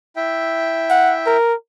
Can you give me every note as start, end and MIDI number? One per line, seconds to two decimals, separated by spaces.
0.16 1.37 64
0.16 1.37 76
0.16 1.37 79
0.90 1.14 78
1.26 1.54 70